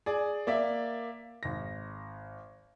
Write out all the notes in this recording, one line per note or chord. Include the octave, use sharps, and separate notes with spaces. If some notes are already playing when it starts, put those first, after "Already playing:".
G#4 D5
A#3 D5 E5
G#1 A#6